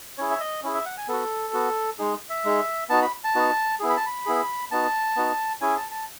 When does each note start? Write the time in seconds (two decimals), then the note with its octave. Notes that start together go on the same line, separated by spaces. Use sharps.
0.18 C#4 E4 G#4 C#5
0.31 E5
0.40 D#5
0.63 C#4 E4 G#4
0.75 E5
0.86 F#5
0.97 G#5
1.08 B3 F#4 A4
1.54 B3 F#4
1.99 G#3 D#4 G#4
2.30 E5
2.45 G#3 D#4 G#4
2.89 B3 D#4 F#4 A5
3.02 B5
3.24 A5
3.35 B3 D#4 F#4
3.80 B3 E4 G#4
3.89 B5
3.97 A5
4.06 B5
4.26 B3 E4 G#4
4.71 B3 D#4 F#4 A5
5.16 B3 D#4 F#4
5.61 C#4 E4 G#4 G#5
5.77 A5
5.91 A5